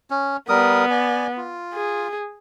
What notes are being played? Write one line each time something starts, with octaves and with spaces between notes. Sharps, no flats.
C#4
G3 B3 A#4 D#6
D5 G#5
F4
G#4